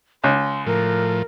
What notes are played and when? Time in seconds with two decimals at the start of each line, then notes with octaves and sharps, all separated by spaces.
0.24 C#2 C6
0.66 A2 F3 A#4